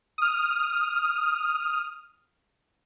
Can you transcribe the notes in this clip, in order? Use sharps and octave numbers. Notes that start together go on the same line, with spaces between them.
D#6 F6